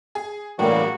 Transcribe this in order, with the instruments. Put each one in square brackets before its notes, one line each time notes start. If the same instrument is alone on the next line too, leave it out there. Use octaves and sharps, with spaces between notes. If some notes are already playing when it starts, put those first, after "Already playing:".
[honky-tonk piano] G#4
[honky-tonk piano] A2 [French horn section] C#3 E3 A#3 [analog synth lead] G3 [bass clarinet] F#4